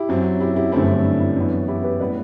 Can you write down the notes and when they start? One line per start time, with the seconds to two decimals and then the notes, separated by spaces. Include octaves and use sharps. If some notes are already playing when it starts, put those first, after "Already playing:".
Already playing: E4 G4
0.09 F#2 F#3 C4
0.41 E4 G4
0.56 E4 G4
0.72 G1 F#2 D3 A3 C4 E4 G4
1.04 D4
1.20 E4
1.37 F#2 E3 B3
1.68 E4 G4
1.84 G4 B4
2.00 A2 G3 B3 B4 D5